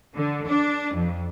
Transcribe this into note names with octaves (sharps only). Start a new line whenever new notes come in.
D3
D4
F2